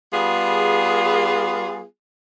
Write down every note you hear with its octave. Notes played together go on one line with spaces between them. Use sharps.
G3 B3 F4 G#4